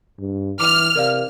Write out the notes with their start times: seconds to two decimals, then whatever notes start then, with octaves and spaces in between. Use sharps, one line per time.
0.19 G2
0.60 E3 D6 F6
0.95 C3 A#4 D5 F5